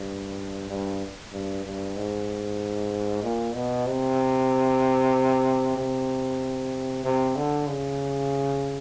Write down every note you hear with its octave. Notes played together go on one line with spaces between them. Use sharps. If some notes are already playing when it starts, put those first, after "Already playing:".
Already playing: G2
G2
G2
G2
G#2
A#2
B2
C3
C3
C3
D3
C#3